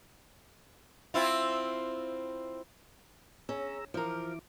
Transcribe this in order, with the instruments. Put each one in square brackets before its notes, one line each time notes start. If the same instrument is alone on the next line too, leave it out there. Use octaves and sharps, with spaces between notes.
[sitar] C4 E4 F4
[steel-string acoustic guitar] C#4 [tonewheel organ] G#4 A#5 E6
[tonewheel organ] E3 E4 D6 [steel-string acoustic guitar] F3 A#4